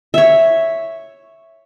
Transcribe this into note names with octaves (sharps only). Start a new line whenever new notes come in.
C#5 E5